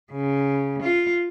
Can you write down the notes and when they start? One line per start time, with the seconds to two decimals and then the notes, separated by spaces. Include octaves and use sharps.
0.11 C#3
0.82 F4